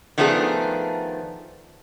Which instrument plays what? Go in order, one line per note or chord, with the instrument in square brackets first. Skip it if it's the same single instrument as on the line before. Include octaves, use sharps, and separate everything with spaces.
[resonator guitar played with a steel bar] D#3 F3 A3 B3 D4 G#4